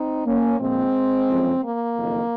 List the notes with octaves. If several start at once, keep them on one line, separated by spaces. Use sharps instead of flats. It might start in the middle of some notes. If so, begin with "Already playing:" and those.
Already playing: C4 D#4
A#3 C#4
A#1 A#2 F3 G#3 C4
F#1 F2 C#3
A#3
F#1 F2 D#3